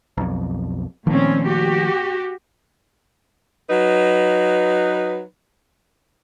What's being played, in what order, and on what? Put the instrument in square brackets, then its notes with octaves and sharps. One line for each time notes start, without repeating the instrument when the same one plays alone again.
[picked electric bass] B1 F2
[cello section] A#2 C4 C#4 [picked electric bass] D#3 F3 A3
[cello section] F#4 G4
[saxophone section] F#3 D#4 B4